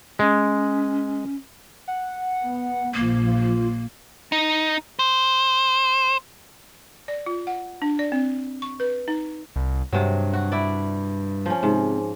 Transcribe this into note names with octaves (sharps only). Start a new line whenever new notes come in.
G#3 C#4
F#5
B3
A#1 F3 A#3
F4
D#4
C5
D5
F4
F#5
D4
D5
C4
C#6
B4
D#4
C2
G2 C3 F#3
F#4
E4 D5
F3 C#4
G#2 C3